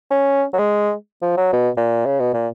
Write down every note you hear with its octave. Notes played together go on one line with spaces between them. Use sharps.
C#4
F#3
G#3
F3
F#3
B2
A#2
C#3
B2
A#2